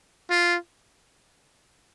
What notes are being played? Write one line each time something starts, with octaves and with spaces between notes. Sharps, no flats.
F4